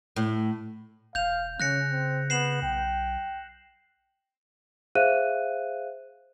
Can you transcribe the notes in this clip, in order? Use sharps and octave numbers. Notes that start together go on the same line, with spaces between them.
A2
E1 F5 G6 F7
C#3 C#4 F#6 A#6 C#7
C4
B3 C7 E7 F#7
B1 G5
G#4 C5 E5 F5 F#6 D#7